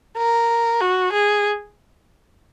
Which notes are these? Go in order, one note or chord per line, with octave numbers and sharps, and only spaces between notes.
A#4
F#4
G#4